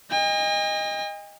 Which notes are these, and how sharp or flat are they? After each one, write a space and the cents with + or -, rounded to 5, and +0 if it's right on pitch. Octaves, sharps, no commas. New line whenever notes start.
D#5 +0 G#5 -45